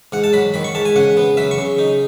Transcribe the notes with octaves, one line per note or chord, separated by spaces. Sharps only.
G#2 F#5
A5
F#3 B5
D#3 B5
C#6
G#2 A5
G#5
C#3 F#5
B3
F#3 E5
C#6
C#3
D#4